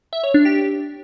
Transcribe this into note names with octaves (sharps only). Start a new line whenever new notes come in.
E5
C#5
D4
G4